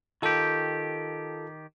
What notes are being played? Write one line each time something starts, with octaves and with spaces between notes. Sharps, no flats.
D#3 F4 G4 A4